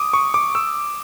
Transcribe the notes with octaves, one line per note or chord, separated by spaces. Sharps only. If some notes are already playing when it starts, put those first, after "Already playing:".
Already playing: D6 D#6
C#6
D6
E6